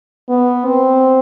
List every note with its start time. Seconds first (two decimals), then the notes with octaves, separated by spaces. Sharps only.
0.29 B3
0.65 C4